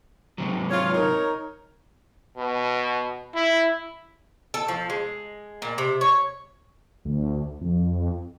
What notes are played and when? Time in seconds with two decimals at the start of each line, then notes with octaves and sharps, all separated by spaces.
0.38 G#2 C3 F#3
0.70 F4 C#5
0.93 D#4 A#4 C#5
2.37 B2
3.34 E4
4.54 A4
4.68 F3
4.90 G#3
5.62 A#2
5.78 C3
6.01 C#5
7.05 D2
7.61 F2